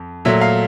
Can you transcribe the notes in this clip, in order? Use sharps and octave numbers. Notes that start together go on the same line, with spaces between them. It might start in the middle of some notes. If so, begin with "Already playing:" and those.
Already playing: F2
A#2 F#3 A3 E5
F5